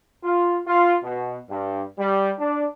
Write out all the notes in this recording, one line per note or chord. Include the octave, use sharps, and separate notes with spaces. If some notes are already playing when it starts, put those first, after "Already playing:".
F4
F4
B2
G2
G3
D4